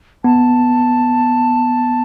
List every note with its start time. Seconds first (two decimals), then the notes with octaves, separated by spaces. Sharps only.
0.24 B3 A5